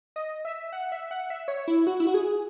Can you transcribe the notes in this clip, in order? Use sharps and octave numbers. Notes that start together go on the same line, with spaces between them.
D#5
E5
F#5
E5
F#5
E5
C#5
E4
F#4
E4
F#4
G#4